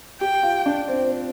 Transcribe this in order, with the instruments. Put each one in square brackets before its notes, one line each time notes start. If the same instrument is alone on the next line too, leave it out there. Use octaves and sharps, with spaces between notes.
[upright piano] G4 [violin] G5
[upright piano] F4
D4
C4
C4